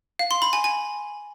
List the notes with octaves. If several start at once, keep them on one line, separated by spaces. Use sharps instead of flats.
F5
C6
B5
G#5
G#5